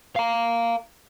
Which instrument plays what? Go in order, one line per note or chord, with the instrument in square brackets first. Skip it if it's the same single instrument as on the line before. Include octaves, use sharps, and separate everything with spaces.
[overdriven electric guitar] F5 A#5